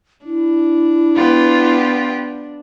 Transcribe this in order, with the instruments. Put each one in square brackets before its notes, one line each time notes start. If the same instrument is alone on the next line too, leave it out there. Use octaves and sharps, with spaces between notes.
[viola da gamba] D4 [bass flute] E4
[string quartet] B3 F4 G4